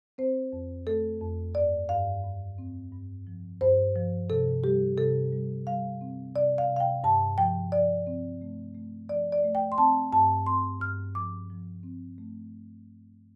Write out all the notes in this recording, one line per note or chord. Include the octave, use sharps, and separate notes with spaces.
C4 C5
F2
A3 A4
F2
G2 D5
G2 F5
G2
C4
G2
F3
G2 C5
F3
C3 A4
G3 G4
C3 A4
G3
G3 F5
C4
C3 D5
F5
C3
F5
G5
G2 A5
F3 G5
F3 D5
C4
A3
A3
F3 D5
D5
A3
G5
C6
C4 A5
G2 A5
C4 C6
G2 F6
F3 D6
F3
C4
A3